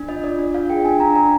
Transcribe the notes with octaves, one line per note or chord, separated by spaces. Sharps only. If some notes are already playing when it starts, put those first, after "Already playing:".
Already playing: D4
F4 D#5
F4 D5
D4
F4 F5
G#4 G5
D4 G#5
D4 A#5
D4 A#5